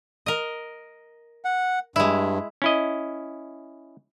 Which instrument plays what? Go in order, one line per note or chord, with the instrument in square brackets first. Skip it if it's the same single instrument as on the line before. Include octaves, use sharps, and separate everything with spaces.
[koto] A#4 D#5
[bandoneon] F#5
[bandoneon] G2 [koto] G#3 E4
[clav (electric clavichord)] C#4 E4 D#5